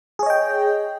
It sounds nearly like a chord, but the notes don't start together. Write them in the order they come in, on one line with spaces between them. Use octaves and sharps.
G#4 C#5 D#5 G5